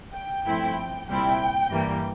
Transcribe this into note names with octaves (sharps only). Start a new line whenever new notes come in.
G5
G2 F3 A3 C4 E4
C2 A#2 G3 C4 E4 G5
G2 E3 G3 A#3